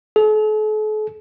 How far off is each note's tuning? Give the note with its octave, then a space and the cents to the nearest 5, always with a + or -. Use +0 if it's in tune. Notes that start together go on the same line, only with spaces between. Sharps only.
A4 -45